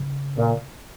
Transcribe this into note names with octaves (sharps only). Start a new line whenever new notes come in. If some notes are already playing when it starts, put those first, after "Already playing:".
Already playing: C#3
A#2